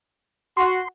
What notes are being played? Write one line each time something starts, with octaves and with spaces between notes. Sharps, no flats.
F#4 C6